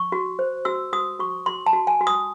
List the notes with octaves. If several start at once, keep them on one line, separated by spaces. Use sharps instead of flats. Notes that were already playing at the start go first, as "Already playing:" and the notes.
Already playing: C#6
F#4
C5
F#4 E6
F#4 D#6
F#4 C#6
F#4 C6
A5
F#4
G#5
F#4
D#6